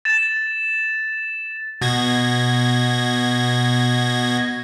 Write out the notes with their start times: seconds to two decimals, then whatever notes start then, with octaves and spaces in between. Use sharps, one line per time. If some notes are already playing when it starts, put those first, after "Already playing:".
0.05 A6 E7
1.81 B2 G#6 A#6